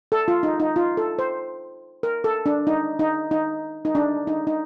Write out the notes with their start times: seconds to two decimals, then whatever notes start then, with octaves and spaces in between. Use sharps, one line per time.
0.12 A4
0.28 F4
0.43 D#4
0.60 D#4
0.76 F4
0.97 A4
1.19 C5
2.03 A#4
2.24 A4
2.46 D4
2.67 D#4
2.99 D#4
3.31 D#4
3.85 D#4
3.95 D4
4.27 D#4
4.47 D#4